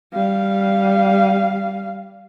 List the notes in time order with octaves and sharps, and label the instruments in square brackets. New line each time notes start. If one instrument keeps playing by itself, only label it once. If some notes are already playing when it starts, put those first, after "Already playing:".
[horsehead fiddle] G3 F5